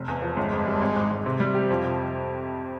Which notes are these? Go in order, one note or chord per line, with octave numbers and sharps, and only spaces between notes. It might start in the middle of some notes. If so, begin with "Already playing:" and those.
Already playing: F1
E2
F3
G1 G#3
F2
G3
G#1
G#2
G#1
C3
G3
G4
F2 F3
C3